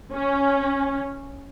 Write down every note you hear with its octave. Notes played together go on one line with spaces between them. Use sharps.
C#4